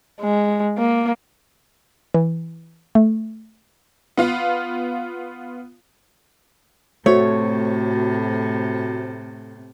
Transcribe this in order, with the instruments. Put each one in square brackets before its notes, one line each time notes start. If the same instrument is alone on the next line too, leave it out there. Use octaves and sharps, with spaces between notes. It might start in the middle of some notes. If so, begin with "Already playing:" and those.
[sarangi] G#3
A#3
[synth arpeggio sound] E3
A3
[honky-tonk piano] B3 F4 F5
[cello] A2 C3 [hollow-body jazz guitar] A3 [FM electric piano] F#4 C5 [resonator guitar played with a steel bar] C#5